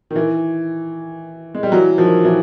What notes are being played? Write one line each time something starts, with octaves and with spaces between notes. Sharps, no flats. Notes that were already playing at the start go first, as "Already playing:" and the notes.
D#3
E3
G#3
G3
E3 F#3
D#3 F3
E3 F#3